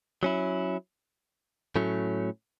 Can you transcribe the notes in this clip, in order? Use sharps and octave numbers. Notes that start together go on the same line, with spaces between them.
F#3 C#4 E4
A2 F#3 A3 C#4